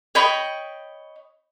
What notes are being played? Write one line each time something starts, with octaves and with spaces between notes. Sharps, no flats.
C#5 D#5 G5 B5